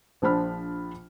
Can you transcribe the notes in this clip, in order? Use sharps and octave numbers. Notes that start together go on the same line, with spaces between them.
A#1 F3 D4 C5 B5 F6